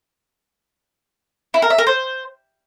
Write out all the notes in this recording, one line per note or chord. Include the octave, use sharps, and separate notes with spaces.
E4
A#4
E5
A#4
C5